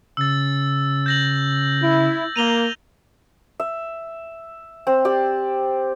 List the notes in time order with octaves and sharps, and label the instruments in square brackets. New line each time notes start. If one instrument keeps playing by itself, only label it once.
[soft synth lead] C#3 [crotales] E6 A6
[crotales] G6 A#6 F#7
[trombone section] E4
[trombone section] A#3 [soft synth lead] A#5 [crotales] D#7 F7 G7
[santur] E5
C4
G4 D5